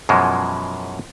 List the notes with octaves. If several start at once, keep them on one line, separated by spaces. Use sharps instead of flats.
F#2 B2 E3 F3 G#3